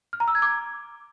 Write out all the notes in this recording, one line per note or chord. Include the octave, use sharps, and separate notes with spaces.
F6
A#5
E6
G#6
D6